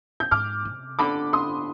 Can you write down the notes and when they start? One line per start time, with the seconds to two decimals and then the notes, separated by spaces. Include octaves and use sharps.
0.20 G6
0.31 G#2 D6 F6
0.65 C3
0.99 D3 B5 D6
1.33 C6 D#6